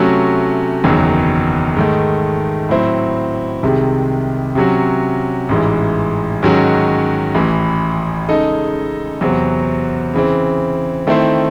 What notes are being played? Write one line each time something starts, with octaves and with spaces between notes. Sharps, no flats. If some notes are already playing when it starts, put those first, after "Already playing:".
Already playing: C3 F#3 A3 C#4 F#4
F#1 E2 D#3 F#3
G#2 D#3 A3
A2 F#3 C4 E4 C5
C2 C3 D#3 G#3
C3 F#3 C#4 F#4
A1 G#2 E3
G#2 D#3 F#3 C#4 F#4
A1 A2 E3
C#3 G#3 D#4 A4 D#5
E2 C3 F#3 C4 F#4
C#3 E3 C4
D#3 A3 C4 E4 C5